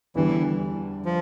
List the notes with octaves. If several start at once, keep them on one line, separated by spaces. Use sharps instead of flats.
E2 D3 E3 G3
F3